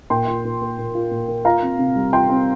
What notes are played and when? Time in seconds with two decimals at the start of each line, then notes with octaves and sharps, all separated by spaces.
0.10 A#2 G5 C6
0.28 F4
0.45 A#2
0.61 A#3
0.78 A#2
0.95 F4
1.11 A#2
1.28 A#3
1.45 F4 F5 A#5
1.62 C4
1.79 C3
1.96 G3
2.13 F4 G5 C6
2.30 C4